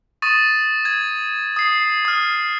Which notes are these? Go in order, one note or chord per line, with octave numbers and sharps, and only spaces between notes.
C#6 D#6 A6 D#7
G#6
D#6 C7
D#6 F6